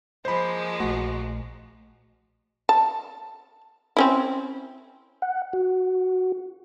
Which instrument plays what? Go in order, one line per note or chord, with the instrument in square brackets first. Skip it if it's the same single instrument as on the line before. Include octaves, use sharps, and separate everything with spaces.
[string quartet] F3 G#3 A#3 [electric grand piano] C5 B5
[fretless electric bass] A#1 A3 [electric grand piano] F#4
[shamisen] A5
C4 C#4 E4
[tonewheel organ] F#5
F#4